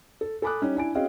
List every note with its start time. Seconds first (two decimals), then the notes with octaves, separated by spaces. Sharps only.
0.21 A4
0.42 A4 G#5 B5 D6 D#6 F#6
0.62 G3 C#4 D#4 G4
0.75 D4 E4 G#5 D7
0.95 C4 C#4 F#4 G#4 D#5 F5